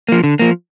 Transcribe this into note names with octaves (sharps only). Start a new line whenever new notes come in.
F3 A#3
D3
F3 A#3